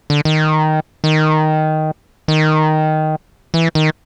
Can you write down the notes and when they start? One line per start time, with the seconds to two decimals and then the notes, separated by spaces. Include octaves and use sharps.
0.10 D3
0.25 D#3
1.04 D#3
2.28 D#3
3.54 E3
3.75 D#3